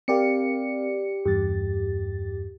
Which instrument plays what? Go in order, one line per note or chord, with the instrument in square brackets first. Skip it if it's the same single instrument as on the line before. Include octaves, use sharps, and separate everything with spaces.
[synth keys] C4 A#4 F5 [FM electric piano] G4 D5 C#7
[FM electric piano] E2 G2 [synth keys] G4 A6